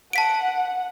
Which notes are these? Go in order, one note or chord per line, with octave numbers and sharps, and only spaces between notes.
F#5 A5 B6 D7